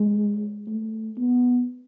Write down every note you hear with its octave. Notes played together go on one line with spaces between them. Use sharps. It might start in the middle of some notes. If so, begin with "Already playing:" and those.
Already playing: G#3
A3
B3